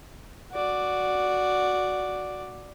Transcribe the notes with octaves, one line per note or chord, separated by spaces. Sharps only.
F#4 D5